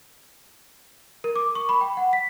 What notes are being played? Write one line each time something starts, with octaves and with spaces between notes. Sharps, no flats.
A#4
D6
C#6
B5
G5
F#5
B6